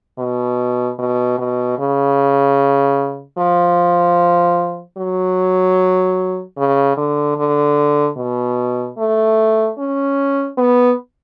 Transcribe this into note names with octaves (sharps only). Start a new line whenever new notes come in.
B2
B2
B2
C#3
F3
F#3
C#3
D3
D3
B2
A3
C#4
B3